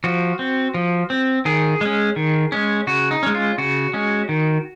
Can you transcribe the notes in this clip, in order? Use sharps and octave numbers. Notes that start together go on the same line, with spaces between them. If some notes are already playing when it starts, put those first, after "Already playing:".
F3 F#4
C4
F3
C4
D#3 G#4
G#3 C#4
D#3
G#3 C#4
C#3 F#4
D#4
G#3 C#4
F4
C#3 F#4
G#3 C#4
D#3